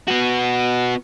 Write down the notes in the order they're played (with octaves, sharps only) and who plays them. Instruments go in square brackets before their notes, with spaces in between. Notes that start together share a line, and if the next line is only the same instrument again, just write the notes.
[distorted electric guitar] B3 F#4